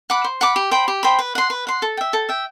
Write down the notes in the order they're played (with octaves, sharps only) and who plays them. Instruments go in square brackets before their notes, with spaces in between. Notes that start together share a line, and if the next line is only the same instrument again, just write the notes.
[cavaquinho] F#5 B5 D6
C5
F#5 B5 D6
G4
C5 G5 B5
G4
C5 G5 B5
B4
F#5 C6
B4
F#5 C6
A4
E5 G5
A4
E5 G5